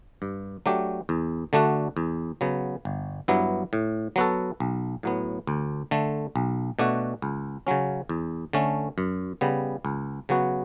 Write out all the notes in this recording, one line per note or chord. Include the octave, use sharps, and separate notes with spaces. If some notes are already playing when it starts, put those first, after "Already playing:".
G2
F#3 A3 D4 G4
E2
D3 A3 D4 F#4
E2
C#3 F#3 B3
G1
G2 F#3 B3 E4
A2
F#3 B3 F#4 A4
B1
A2 F#3 B3
D2
D3 A3
B1
B2 A3 D4 F#4
C#2
C#3 F#3 C#4
E2
D3 A3 C#4
F#2
C#3 G3 B3
C#2
C#3 F#3 B3 F#4